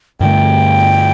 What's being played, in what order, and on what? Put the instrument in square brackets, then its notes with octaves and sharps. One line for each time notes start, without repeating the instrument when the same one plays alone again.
[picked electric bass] G2 D3 A3 [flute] G5